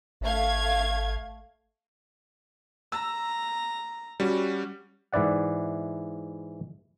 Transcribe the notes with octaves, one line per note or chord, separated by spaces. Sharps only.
G#1 A3 F5 G#6
A#5 E6
G3 C#4 F#4
G#2 E3 E4 D5 F#5